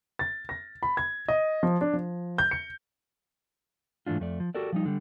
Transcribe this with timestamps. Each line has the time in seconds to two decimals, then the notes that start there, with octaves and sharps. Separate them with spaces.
0.19 A6
0.49 A#6
0.83 B5
0.97 G#6
1.28 D#5
1.63 F3
1.81 D4
1.93 F3
2.38 G6
2.51 C#7
4.06 G#2 E3 A3 D4 F4
4.20 F2 A3 D5
4.40 F3
4.55 F#4 G4 A4 A#4 D5
4.73 F3 G3 D#4
4.86 D3 G3